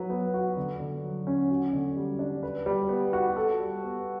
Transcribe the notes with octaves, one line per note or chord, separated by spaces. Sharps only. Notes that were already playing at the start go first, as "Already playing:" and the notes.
Already playing: F#3 B4
B3
F#4
D3
D3
F#3
C#4
F#4
D3
G3
D4
B4
G3
B3
F#4
A4
G3
B3